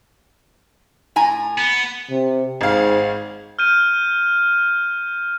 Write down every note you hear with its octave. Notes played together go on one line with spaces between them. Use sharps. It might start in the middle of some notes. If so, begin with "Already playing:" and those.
A2 G#5 A#5
B3
C3
G#1 G#2 F5
F6 G6 D#7